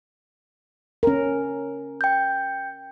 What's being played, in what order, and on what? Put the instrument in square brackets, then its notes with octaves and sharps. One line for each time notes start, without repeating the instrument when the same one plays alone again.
[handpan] C#4 A#4
[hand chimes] G5 G6